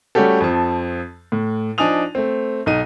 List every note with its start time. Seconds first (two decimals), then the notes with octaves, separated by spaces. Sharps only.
0.15 G3 A3 C#4 F#4 G4 A4
0.41 F2 F3 A5
1.32 A2
1.78 F3 D4 D#4 G#5 D#6 F7
2.15 A3 C4
2.66 B1 D#4 D#7